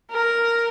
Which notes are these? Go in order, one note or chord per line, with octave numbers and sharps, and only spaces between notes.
A#4